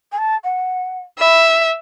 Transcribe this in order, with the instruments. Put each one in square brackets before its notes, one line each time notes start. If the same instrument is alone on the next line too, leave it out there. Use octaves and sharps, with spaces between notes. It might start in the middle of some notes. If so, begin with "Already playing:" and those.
[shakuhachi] G#5
A5
F#5
[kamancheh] E5 [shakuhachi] B5